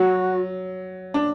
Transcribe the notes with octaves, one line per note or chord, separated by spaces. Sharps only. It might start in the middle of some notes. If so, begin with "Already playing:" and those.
Already playing: F#3 F#4
D4